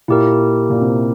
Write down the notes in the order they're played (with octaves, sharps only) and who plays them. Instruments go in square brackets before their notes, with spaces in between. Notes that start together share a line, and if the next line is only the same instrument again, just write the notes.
[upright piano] A#2 [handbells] E4 G4 A#4
[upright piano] A#2
C3